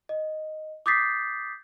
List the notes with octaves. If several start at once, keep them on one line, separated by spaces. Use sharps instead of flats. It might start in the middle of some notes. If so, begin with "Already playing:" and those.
D#5
D6 D#6 G6 A6 B6 C7